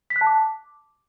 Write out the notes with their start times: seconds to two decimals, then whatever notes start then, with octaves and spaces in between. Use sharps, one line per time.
0.10 B6
0.16 F#6
0.21 A5
0.27 D6